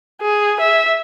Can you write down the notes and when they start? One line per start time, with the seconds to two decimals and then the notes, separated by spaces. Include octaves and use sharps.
0.21 G#4
0.60 E5